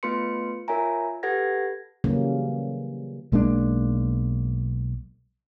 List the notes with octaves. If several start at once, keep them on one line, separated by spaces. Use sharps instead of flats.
A3 B3 F4 B4 C6 C#7
F4 A#4 C#5 E5 G#5 A#5
G4 A4 B4 F#5 G#6 A#6
C#3 E3 F#3 G3 A#3 C#4
B1 G#3 A#3 D4